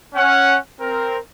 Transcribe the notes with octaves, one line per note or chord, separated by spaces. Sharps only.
C#4 F#5
C4 A#4